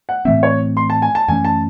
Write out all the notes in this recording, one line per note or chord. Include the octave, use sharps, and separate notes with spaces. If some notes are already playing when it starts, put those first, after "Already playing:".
F#5
A2 E3 A3 C4 E5
C#5
C6
A5
G#5
A5
F#2 E3 A3 C#4 G#5
A5